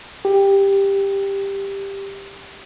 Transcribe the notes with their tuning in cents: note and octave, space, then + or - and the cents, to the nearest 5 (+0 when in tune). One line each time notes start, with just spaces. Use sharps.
G4 +10